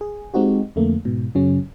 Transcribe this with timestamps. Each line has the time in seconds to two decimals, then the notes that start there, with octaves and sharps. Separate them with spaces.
0.01 G#4
0.34 G#3 C4 D#4 F#4 G4
0.76 F2 D3 A3 A#3
1.05 G#2 B2
1.35 F#2 C#3 F#3 C#4